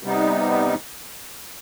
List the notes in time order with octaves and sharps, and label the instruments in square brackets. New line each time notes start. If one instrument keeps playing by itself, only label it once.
[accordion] C3 G3 B3 D#4